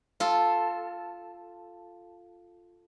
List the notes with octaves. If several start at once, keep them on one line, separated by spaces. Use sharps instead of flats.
F4 A4